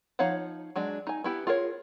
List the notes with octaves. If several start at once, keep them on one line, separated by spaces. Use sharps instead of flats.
F3 D#4 C#5 F5 F#5
F#3 G#3 D4
D#4 G#5
B3 E4 G4
F4 G#4 A#4 C#5